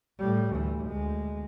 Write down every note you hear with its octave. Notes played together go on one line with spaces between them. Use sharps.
A2 G3
D2 E3
D2 G#3